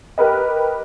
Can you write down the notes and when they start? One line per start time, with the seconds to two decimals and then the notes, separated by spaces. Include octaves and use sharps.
0.18 G4 A#4 B4 D#5